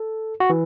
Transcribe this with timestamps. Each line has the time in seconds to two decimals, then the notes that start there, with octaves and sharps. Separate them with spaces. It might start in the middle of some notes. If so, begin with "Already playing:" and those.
Already playing: A4
0.40 F#4
0.50 E3